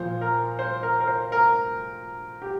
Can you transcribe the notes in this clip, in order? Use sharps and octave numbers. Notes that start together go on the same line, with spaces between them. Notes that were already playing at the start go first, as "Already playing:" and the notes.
Already playing: A#2 F3 C5
A#4
C5
A#4
A#4
C5
A#4
G4